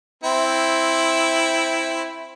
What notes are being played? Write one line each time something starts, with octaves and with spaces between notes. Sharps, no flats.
C4 E4